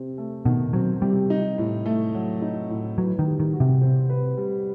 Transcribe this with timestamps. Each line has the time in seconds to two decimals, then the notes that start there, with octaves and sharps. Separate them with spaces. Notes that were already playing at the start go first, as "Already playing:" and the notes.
Already playing: C3 C4
0.18 A3
0.45 B2 D#3
0.73 F#3 C4
1.02 C3 G3
1.30 D#4
1.58 A2
1.86 A3
2.14 F#3
2.42 D#4
2.69 A2
2.98 F#3 B4
3.19 D#3
3.26 G3
3.40 D#3
3.54 F#4
3.60 C3
3.81 C4
4.10 B4
4.37 G3